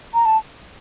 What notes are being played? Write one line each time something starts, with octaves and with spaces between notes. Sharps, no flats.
A#5
A5